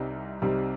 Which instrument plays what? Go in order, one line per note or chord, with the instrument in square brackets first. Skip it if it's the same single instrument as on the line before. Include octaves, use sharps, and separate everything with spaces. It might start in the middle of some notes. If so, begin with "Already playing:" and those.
Already playing: [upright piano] C2 C3 G3 C4 D#4
C2 C3 G3 C4 D#4